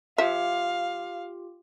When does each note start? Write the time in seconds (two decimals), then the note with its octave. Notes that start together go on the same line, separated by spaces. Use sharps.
0.18 F3 F4 G4 E5 F5